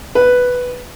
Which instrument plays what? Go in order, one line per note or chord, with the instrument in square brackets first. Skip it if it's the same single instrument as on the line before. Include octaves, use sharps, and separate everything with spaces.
[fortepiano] B4